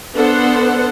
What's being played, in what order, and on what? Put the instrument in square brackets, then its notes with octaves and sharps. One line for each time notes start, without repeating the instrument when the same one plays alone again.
[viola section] B3 D4 A4 C5 F#5